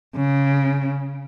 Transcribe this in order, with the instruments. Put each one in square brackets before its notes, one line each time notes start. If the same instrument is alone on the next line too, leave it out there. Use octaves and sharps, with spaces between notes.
[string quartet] C#3